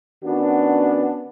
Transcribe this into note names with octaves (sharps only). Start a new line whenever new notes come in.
D#3 B3 C#4 D4 F#4